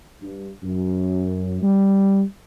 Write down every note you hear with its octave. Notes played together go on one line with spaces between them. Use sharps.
G2
F#2
G3